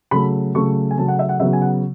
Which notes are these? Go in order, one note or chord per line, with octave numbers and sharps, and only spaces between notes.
C#3 F#3 A3 B5
C#3 F#3 A3 C#6
G#5
C#3 F#3 A3 A5
F#5
E5
F#5
C#3 F#3 B3 E5
G#5
F#5